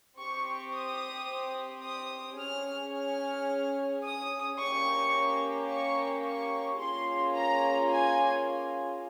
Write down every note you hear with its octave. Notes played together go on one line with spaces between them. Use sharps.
C4 G4 C#6
D#6
D#6
C#4 G#4 F6
F6
D#6
A#3 C#4 G4 C#6
C#6
C#6
A#3 C#4 F4 G#4 C6
A#5
G#5